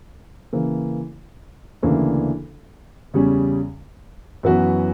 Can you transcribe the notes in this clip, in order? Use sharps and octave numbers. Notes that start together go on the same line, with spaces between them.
C#3 E3 A#3
D2 C#3 E3 A#3 D4
E2 C#3 G3 C#4
F#2 E3 B3 F#4 B4